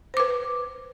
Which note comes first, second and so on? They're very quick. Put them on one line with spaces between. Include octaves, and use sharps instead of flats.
C5 D6 B4